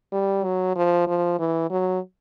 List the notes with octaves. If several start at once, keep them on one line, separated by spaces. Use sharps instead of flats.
G3
F#3
F3
F3
E3
F#3